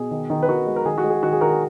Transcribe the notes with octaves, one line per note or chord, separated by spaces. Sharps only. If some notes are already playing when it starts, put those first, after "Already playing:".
Already playing: B2 G#4
D#3
D#3
B4
D#3 F#4 A#4
G#3
A#4
D#3 G#4
F#4
G#3
G#4
D#3 F#4
G#4
D#3 F#4 A#4
G#4